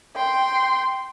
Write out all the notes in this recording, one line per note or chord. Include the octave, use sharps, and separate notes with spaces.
G5 C6